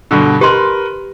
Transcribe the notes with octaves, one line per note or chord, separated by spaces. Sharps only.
G2 B2 D3
G4 A#4 B4 C6